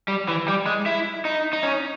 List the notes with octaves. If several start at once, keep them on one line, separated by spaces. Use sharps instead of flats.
G3
E3
G3
G#3
E4
D#4
D#4
C#4